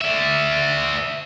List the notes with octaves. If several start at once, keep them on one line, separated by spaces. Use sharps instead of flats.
D5 E5